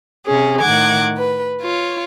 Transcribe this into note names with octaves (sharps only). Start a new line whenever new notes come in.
C3 C#4 G#4
A2 D#3 F#5 D6 G#6
B4
F4 C#5